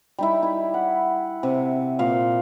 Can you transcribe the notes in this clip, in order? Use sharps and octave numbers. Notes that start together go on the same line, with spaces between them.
G3 D#4 E4
E4 D6
F#5
C3
A#2 F5